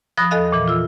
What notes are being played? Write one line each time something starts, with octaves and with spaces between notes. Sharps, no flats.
F3 B5 D#6 F#6 A#6
E2 A4 D#5 F5 F#6
A#2 E3
F4 E6